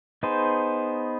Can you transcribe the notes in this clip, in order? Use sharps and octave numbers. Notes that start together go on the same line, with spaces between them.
B3 D#4 G#4 C5